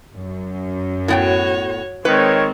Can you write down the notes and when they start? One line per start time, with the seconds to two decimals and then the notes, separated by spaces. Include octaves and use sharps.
0.12 F#2
1.08 A2 B3 F#4 C#5 G5
2.05 D#3 G#3 C4 B4 C#5